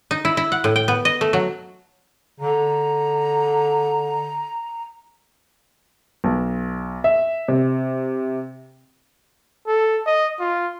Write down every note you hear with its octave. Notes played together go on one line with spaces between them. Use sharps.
D#4
E4
E4
F#5
A2
G5
B3
D#5
A3
F#3
D3 A#5
B1
E5
C3
A4
D#5
F4